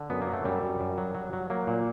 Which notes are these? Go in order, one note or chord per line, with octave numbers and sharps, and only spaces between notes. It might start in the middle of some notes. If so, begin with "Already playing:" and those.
Already playing: D3
F#2 B3
A#3
F#3
A3
F#2 G3
F#2
F#2
F#3
F#3
F#3
F#3 A#3
A#2